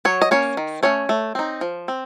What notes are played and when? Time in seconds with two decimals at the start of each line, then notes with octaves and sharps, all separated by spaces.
0.05 F#3 C#5
0.22 D#5
0.31 A#3 C#4 C#5
0.57 D#3
0.83 A3 C#4 C#5
1.09 A3
1.35 C4 D#4
1.61 F3
1.88 C4